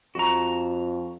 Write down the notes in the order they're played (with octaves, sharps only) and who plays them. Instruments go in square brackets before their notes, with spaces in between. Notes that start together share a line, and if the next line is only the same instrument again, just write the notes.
[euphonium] F2 [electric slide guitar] F#4 A#5